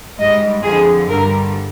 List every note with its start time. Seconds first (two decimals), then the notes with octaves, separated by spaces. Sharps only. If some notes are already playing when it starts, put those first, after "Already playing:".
0.18 G#2 G3 D#5
0.62 F2 D3 F3 G#4
1.08 G2 D3 G3 A#4